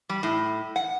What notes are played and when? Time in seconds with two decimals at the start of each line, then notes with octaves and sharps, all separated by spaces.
0.09 G3
0.23 A2
0.76 F#5